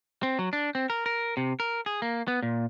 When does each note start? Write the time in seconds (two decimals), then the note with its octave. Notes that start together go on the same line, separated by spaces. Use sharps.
0.23 C4
0.39 F#3
0.53 D4
0.75 C4
0.90 A#4
1.06 A#4
1.37 C3
1.60 A#4
1.86 G#4
2.02 A#3
2.28 B3
2.43 A#2